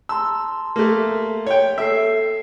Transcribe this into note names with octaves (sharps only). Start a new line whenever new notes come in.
A5 A#5 C6 E6
A3 A#3
C#5 G5
A#3 A4 E5 C7